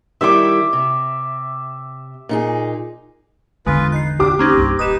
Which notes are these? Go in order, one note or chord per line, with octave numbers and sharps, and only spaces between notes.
D#3 G3 E4 E5 D6
C3
A#2 D#4 G#4
G#1 E2 D3 G#3 F4 B4
D#4 F#6 C7
D4 G4 D6
A#3 C4 C#4 D#4
C2 G2 C3
D#1 D#4 B4 D#6 E7